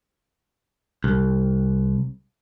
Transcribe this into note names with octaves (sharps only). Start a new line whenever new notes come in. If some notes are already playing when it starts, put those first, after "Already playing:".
C2